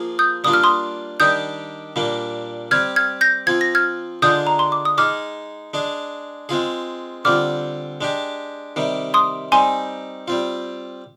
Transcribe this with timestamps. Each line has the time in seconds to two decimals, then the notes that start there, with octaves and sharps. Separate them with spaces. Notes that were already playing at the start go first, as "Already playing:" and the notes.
Already playing: F3 A#3 F4 G#4
0.19 D#6 G6
0.44 G3 A#3 D4 F4 D#6
0.53 F6
0.64 C6 D#6
1.20 D#3 G3 D4 G4 D#6 G6
1.96 A#2 G3 A#3 D4
2.71 G3 C4 G4 F6 G#6
2.96 F6 G#6
3.21 G6 A#6
3.47 F3 C4 F4 G#6
3.61 A#6
3.75 F6 G#6
4.22 D3 G#3 D4 F4 G#4 D#6 G6
4.47 A#5
4.59 C6
4.72 D6
4.85 D#6
4.98 G#3 D#4 G#4 D6 F6
5.74 G#3 D4 G#4
6.49 G#3 C4 F4 G#4
7.25 D3 G3 C4 F4 D6 F6
8.01 G#3 D4 G4
8.76 C3 D#3 G3
9.14 C6 D#6
9.52 G3 C4 D#4 G#5 C6
10.28 G3 C4 F4